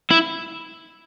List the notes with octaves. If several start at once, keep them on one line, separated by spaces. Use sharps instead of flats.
E4